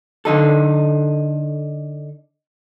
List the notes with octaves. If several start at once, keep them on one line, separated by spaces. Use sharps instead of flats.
D3 D#4 A4